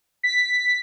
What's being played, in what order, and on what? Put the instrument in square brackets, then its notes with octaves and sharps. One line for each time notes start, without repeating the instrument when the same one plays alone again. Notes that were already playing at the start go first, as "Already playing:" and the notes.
[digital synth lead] B6